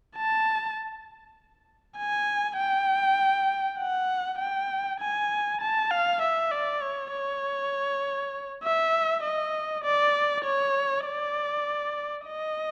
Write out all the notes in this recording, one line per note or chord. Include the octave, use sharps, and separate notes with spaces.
A5
G#5
G5
F#5
G5
G#5
A5
F5
E5
D5
C#5
C#5
E5
D#5
D5
C#5
D5
D#5